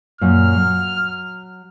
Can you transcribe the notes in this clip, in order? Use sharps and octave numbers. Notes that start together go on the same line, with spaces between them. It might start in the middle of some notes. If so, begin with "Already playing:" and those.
F#2 A#2 F6
F#3